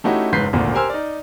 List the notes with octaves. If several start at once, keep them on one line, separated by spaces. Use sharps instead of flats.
A3 C#4 D#4 E4 F#4 G4
F#1 G#2 B4 G6 B6 C7
G#1 D2 A#2
G4 A#4 C5 G#5 E6 F6
D#4 D5